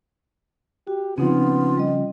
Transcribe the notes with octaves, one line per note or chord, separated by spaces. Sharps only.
F#4 G4
C#3 F3 B3 C4 D#4 F4
G3 D#5